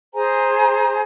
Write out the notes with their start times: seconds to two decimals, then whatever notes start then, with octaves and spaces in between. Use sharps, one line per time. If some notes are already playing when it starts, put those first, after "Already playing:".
0.14 G#4 C5 G#5 A#5